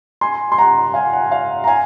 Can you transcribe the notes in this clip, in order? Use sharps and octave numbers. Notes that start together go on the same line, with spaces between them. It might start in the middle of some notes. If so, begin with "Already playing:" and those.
G#5 C6
C6
F#5 A#5
F5 G#5
F#5
F5
A#5
F5 G#5